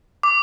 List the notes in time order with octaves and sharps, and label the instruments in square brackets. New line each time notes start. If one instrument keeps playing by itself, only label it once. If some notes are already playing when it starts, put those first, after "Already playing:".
[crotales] D6